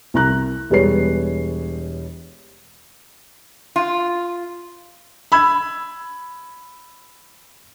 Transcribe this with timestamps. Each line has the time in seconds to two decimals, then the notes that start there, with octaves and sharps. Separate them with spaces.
0.14 C2 A#5 F#6
0.70 E1 G3 G#4 B4 C#5 C7
3.76 F4
5.32 B5 E6 G#6